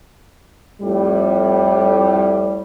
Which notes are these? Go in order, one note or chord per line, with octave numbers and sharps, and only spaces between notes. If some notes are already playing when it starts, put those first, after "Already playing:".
F2 A2 G3